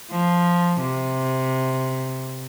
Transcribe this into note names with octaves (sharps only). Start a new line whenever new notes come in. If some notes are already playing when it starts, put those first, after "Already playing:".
F3
C3